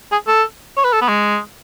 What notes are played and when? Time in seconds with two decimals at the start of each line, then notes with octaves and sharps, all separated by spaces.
0.12 G#4
0.27 A4
0.77 C#5
0.84 B4
0.92 A4
1.01 B3
1.08 G#3